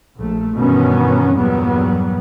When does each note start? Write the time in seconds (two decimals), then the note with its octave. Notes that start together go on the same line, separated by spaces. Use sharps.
0.18 A#1 A3
0.55 G2 B2 D#3 E3 B3 C#4
1.36 E2 G2 A#2 F#3 G3 B3